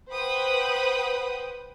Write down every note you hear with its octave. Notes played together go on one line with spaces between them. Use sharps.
B4 C5 F#5 G5 B5 D#6